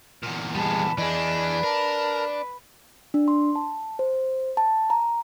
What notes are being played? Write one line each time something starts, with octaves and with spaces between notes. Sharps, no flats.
E2 A#2
G3 G#4 B4 A5
E3 D4 G#4 D#5
A#4 A5
D4
C6
A5
C5
A5
A#5